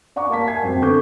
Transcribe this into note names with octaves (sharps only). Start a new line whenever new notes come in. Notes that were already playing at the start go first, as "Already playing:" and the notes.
D5 F#5 A#5 C#6 D6
A#3 F5 A5 B6
E5 F#5 G#5 A5 G#6 C7
F#2 C4 G5
D3 B3 A4 C#6 D6 G6